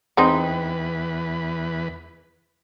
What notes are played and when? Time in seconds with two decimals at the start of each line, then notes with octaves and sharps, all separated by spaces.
0.17 E2 G#3 C4 D#4 B4